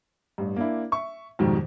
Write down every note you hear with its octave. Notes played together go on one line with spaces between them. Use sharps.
A1 G2
A#3 D4 E4
E5 C#6
F2 G#2 B2 D#3 G3